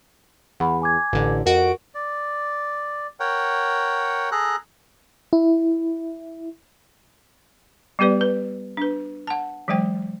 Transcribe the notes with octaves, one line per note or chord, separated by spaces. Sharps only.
E2 F#5 B5
G#5 D6 G#6
A1 D3
F2 F#4 A#4 D#5 D7
D5
A#4 C#5 F#5 G5
G#4 A4 A#5 F#6
E4
G3 B3 G4 B4 D5
B4
D4 B4
F#5 A5
E3 F#3 G#3 C5 G5